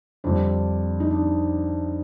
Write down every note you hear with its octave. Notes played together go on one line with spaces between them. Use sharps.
F2 D3 G3 D4
D#4
D4